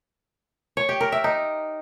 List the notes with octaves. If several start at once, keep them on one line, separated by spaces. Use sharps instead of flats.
C#5
G4
A#4
E5
D#4